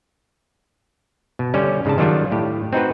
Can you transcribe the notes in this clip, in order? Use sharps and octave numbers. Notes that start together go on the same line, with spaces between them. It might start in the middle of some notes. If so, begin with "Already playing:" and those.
B2
D3 G3 C#4
G#2 C#3 D4 A5
D#3 F#3 G3 D4 F4
A2 G4
C4 D#4 F#4 B4